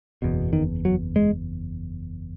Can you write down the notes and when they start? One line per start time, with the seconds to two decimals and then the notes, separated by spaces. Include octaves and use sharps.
0.22 F#1 E2 B2
0.53 D#3
0.85 F#3
1.16 G#3